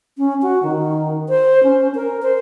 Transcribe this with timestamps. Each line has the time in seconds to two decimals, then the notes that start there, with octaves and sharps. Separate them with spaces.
0.18 C#4
0.42 F#4
0.63 D#3
1.29 C5
1.63 C#4
1.95 A#4
2.22 C5